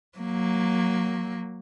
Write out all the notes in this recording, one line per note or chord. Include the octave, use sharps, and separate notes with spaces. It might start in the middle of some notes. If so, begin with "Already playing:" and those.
F#3 A#3